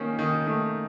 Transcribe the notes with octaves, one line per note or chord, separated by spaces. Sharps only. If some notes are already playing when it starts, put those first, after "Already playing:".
Already playing: D#3 A#3 C#4
D#3
D#3 A3